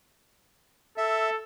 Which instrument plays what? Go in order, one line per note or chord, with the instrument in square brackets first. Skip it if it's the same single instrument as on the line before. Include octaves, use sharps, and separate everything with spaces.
[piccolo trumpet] A4 [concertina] E5